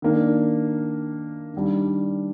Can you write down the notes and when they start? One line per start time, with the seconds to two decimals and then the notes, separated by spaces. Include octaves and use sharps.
0.02 D#3 A#3 D4
1.54 D#3 G3 D4